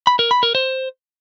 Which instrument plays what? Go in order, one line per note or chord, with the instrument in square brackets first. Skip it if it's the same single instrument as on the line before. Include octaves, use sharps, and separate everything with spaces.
[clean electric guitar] B5
A#4
B5
A#4
C5